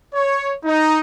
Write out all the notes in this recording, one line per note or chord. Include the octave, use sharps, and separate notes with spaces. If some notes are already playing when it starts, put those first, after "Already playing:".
C#5
D#4